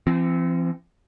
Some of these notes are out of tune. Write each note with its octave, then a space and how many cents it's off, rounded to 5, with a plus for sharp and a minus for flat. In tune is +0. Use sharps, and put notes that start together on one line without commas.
F3 -45 C4 +0